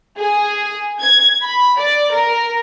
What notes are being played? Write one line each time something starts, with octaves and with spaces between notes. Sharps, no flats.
G#4
G#6
B5
D5
A#4